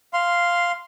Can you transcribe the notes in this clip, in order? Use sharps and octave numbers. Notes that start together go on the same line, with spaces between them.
F5 C6